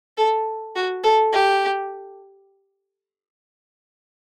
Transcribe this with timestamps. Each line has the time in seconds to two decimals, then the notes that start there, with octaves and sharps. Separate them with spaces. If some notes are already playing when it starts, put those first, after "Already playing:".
0.18 A4
0.76 F#4
1.04 A4
1.32 G4